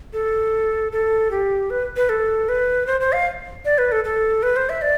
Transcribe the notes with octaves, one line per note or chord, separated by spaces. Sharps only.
A4
A4
G4
B4
B4
A4
B4
C5
C5
F5
D5
B4
A4
A4
B4
C5
E5
D5